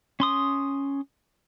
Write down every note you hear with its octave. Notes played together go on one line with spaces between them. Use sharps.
C#4 C6 D#6